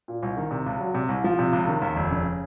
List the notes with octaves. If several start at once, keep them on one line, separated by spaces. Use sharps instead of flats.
A#2
C2
D#3
C3
C#2
F#3
C3
C2
F3
C3
C#2
D#3
D#2
F1
C#3